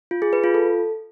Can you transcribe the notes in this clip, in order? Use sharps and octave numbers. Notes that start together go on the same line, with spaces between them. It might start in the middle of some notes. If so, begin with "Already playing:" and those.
F4
G#4
B4
F4
A4